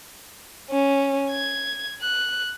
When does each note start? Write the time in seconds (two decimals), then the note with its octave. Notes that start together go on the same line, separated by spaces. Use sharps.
0.70 C#4
1.29 G#6
2.02 F#6